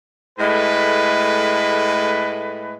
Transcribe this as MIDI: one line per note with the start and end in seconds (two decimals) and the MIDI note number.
0.39 2.76 45
0.39 2.76 56
0.39 2.76 57
0.39 2.76 71